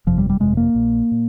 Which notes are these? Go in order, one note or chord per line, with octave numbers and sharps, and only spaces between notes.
G1 F2 C3 F3
G3
G3
G1 F2 C3 G#3
A#3
A#1 A#2
A#2